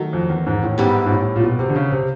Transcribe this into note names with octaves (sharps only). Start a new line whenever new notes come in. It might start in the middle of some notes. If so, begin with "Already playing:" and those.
Already playing: D#3 F#3 A3
F2
E2
G#2
A2
G#2 G3 B3 E4 G4
G#2
A2
A#2
B2
C3
D3
C#3
C3